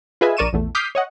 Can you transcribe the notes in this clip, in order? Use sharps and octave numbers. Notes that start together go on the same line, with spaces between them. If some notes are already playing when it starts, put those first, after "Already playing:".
F4 G#4 B4 D#5 E5 G#5
A#1 A#4 D5 C#6 D#7 E7
A#1 E2 A3
D6 D#6 F6 G6 B6 C7
C#5 D#5 F#5